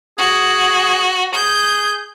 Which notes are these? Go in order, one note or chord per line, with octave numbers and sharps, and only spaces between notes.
F#4 G#4
G#4 G6